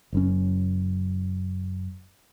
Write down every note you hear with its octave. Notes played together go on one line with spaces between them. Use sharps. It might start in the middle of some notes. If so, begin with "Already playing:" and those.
F#1 F#2 C#4